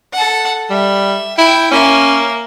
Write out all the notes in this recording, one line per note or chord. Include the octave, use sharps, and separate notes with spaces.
A4 F#5
G3 E5
E4 G5
A#3 C#4 E5